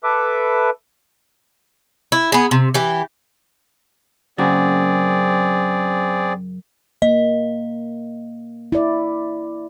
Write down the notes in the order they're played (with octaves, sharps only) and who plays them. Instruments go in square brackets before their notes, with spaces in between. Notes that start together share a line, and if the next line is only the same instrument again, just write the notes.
[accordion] A4 B4 E5 D6
[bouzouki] E4
B3 G#4
C3
E3 G4
[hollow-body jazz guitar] F#2 C#3 F#4 [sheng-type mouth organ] C4 G#4 D5
[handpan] A#3 [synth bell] D#5
[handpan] E4 D5